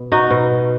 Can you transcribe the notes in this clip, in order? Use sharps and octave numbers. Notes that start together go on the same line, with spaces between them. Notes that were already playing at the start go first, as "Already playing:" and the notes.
Already playing: B2
D#4 F#4
B2